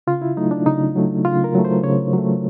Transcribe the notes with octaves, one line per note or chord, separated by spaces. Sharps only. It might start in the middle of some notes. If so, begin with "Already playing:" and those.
C#3 F4
E4
F#3 A3 D#4
D4
C#3 D#4
F#3 A3
C#3 F4
A#4
F#3 A3
C5
C#3 C#5
F#3
A3